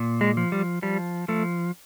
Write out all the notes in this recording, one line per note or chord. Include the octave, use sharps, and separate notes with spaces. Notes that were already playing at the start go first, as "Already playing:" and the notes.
Already playing: A#2
G#3
F3
G3
F3 G3
F3 A3